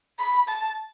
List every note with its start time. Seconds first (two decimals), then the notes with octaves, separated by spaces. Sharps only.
0.18 B5
0.48 A5